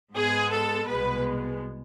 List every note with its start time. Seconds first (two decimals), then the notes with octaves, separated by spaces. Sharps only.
0.14 G#2 G#3 B3 G#4
0.51 A4
0.88 C2 B2 G#3 B3 B4